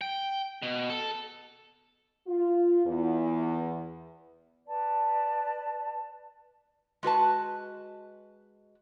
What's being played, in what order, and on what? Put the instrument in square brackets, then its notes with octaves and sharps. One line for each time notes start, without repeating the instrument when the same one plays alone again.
[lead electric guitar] G5
B2
A4
[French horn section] F4
E2
[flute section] B4 D5 A5
[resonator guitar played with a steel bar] G#3 F#4 B4 A5